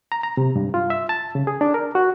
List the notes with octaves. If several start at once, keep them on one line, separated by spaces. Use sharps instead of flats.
A#5
A#5
C3
G2
F4
E5
A5
C#3
G#4
D4
A#4
F#4